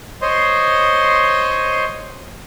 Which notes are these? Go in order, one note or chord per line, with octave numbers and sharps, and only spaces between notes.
C5 C#5 D#5 C6